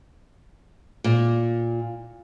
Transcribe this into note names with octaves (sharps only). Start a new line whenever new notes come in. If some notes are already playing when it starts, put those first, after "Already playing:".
A#2